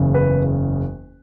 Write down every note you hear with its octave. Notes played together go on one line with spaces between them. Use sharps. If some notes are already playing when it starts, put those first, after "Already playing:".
Already playing: F#1 E2 C#3
B4